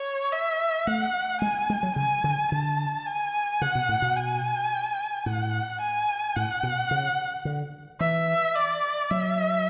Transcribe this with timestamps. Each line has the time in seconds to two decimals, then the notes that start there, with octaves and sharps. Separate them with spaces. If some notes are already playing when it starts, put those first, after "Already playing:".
Already playing: C#5
0.32 E5
0.87 A3 F#5
1.42 G#3 G#5
1.70 G#3
1.83 F#3
1.96 C#3 G#5
2.24 D3
2.52 D3 A5
3.06 G#5
3.61 C#3 F#5
3.75 B2
3.89 A2
4.02 B2
4.16 G#5
5.26 A2 F#5
5.81 G#5
6.36 A2 F#5
6.63 B2
6.91 C#3
7.45 D3
8.00 E3 E5
8.56 D5
9.10 F#3 E5